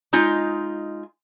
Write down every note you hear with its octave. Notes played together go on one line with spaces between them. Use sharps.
G#3 D#4 F4